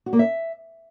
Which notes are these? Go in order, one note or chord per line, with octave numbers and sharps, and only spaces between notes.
F#4
A#3
E5